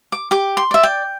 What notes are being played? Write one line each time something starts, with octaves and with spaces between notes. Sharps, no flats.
D6
G4 D6
C6
D5 E5
G5